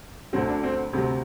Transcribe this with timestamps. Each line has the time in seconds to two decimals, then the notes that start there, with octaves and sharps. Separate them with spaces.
0.33 D2 D3 F#3 C4
0.48 D4
0.63 C4
0.93 D2 C3 F#3 C4